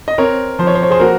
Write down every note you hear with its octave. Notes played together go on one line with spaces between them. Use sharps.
D#5
C4 A#4 C#5
F3 C5
C#5
C5
C#5
G#4 C5
A#3 F#4 A#4